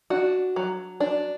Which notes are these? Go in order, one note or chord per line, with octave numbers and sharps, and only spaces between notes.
D4 F#4
F#3
D4